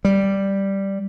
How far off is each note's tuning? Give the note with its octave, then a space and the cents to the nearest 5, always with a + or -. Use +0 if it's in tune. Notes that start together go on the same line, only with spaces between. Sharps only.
G3 +0